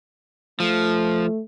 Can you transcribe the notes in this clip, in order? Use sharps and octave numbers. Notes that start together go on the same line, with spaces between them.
F3 A3